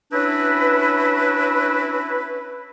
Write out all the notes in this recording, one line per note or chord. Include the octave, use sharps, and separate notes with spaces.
C#4 D4 E4 F#4 B4